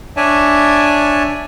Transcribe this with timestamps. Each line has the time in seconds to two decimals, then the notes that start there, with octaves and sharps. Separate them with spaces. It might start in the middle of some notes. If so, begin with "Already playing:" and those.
0.17 D4 C#5 D5 E5 G#5 A5